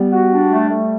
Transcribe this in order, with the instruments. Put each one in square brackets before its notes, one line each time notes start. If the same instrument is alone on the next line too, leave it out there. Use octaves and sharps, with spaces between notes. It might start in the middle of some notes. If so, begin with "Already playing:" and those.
Already playing: [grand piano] G3 [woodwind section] B3
[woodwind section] F#4
D4
A3
A3